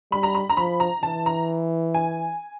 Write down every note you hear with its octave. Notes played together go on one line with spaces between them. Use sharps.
G3 B5
A#5
B5
A#5
F3 B5
A#5
E3 A5
A#5
G#5